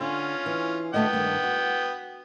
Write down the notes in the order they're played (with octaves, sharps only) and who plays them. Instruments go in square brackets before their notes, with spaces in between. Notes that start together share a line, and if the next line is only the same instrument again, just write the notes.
[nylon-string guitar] D3 [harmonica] C#4 F4
[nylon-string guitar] E3
[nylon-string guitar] D2 A3 D#5 [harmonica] B3 G5
[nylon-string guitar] G2 D#3
F#4